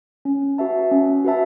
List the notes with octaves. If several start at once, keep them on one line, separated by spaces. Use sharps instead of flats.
C#4
F#4 B4 E5 A5
C#4
F#4 B4 E5 A5